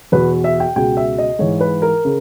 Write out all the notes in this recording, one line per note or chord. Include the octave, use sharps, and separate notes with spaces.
E2 B2 B4
E5
G5
C#2 B2 G5
E5
D#5
G#2 E3 C#5
B4
A#4
C#3